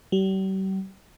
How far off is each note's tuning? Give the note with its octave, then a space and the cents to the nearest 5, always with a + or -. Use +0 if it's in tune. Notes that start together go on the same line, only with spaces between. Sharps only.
G3 -40